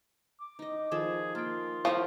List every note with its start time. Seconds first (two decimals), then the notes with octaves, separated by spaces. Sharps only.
0.40 D6
0.59 D#4 D#5
0.91 D#3 F3 G#4 A4
1.35 A#3 F4 G5
1.85 F3 E4 A#4 F#5